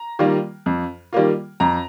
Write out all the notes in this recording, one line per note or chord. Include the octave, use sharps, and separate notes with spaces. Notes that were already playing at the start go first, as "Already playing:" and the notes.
Already playing: A#5
D#3 G3 A#3 F4
F2
D#3 G3 A#3 F4
F2 A#5